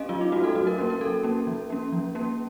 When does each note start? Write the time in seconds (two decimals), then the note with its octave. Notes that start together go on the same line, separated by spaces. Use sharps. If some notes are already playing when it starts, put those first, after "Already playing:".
Already playing: A3 C#4 D#5 F5
0.09 F#3 F4
0.21 D#4
0.32 A3 C#4 F#4
0.44 A4
0.55 F#3 F#4
0.67 A#4
0.78 A#3 C#4
0.90 A#4
1.00 F#3 A4
1.23 A#3 C#4
1.47 F3
1.70 A#3 C#4
1.92 F3
2.15 A#3 C#4